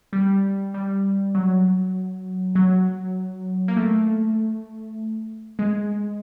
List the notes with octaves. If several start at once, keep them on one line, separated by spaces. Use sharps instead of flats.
G3
G3
F#3
F#3
A#3
A3
G#3